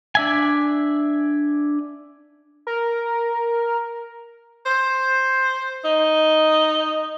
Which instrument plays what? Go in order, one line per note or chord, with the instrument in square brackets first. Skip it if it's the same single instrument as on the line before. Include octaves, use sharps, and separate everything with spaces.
[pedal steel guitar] D4 E5 G#5
[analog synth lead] A#4
[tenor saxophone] C5
D#4